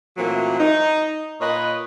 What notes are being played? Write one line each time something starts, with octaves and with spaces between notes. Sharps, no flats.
A#2 E3 F#3 A3 A#3 C4
D#4
A#2 B4 C#5 D#5